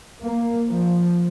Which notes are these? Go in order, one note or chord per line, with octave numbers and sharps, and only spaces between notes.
A#3
F3